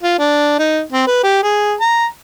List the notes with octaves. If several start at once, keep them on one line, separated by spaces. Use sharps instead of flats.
F4
D4
D#4
C4
B4
G4
G#4
A#5